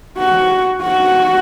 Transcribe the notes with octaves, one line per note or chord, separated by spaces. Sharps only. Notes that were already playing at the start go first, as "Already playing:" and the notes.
F#4
F#4